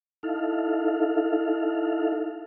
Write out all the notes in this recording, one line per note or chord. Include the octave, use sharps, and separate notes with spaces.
D#4 E4 A4 F5